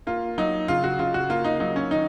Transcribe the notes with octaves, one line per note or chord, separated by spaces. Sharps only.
A#3 F4
F#3 D#4
C#3 F4
F#4
C#3 F4
F#4
A#3 F4
D#4
F#3 D#4
C#4
D#3 D#4